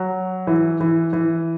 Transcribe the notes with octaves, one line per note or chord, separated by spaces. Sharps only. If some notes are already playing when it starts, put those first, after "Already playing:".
Already playing: F#3
E3
E3
E3